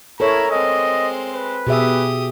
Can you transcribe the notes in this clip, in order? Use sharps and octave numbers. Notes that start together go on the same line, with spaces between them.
E4 A4 A#4 C#5 A#5
G#3 C4 D#5
B4
B2 G4 G#4 E5 D#6